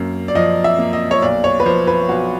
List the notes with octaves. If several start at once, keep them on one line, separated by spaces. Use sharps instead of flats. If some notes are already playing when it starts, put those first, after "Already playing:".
Already playing: F#2 A#3
D5
F3 D#5
E5
A#3
D#5
C#5
B1 D5
C#5
B4
F3 C5
B4
B1 F#4